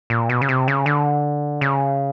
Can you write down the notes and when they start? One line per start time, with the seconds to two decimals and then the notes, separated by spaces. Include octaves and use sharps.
0.10 A#2
0.29 B2
0.41 C#3
0.49 C3
0.68 C#3
0.86 D3
1.61 C#3